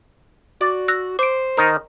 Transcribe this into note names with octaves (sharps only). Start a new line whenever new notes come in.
F#4 D5
E6 F#6 A#6
C5 D6 D7
D#3 D#4 A#4